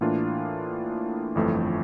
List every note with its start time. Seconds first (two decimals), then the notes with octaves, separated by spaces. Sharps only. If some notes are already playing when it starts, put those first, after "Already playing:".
0.01 A2 E3 A#3 D4 F4
1.35 G1 F2 E3 A3